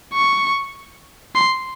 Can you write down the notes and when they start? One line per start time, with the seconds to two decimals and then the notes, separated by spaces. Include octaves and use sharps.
0.14 C#6
1.35 C6